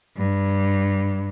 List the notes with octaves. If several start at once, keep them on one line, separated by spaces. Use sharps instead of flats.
G2